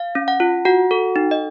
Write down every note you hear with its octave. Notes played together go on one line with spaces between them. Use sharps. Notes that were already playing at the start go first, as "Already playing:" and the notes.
Already playing: F5
C#4
F#5
F4
F#4 F#5
A4
D#4
D#5